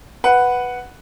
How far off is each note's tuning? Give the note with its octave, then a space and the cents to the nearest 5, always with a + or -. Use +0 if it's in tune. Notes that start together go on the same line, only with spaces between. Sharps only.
B4 +0 F#5 +0